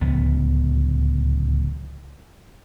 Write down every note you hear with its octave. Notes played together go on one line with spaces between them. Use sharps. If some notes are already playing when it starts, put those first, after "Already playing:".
D1 C#2 F3 B3